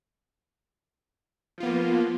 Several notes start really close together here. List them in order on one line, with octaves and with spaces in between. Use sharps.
F3 F4 B3 A#3